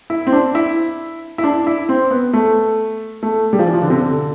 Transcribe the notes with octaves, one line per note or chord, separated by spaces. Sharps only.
E4
C4
D4
E4
E4
D4
E4
C4
B3
A3
A3
G3
F3
E3
F3
D3
C3
D3